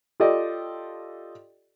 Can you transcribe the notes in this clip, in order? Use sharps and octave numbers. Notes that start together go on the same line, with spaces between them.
F4 G4 A4 D5 D#5